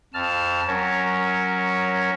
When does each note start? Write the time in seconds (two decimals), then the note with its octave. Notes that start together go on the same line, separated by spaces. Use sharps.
0.14 F2 A5 F6
0.67 F#3 C#4 A#4 C#5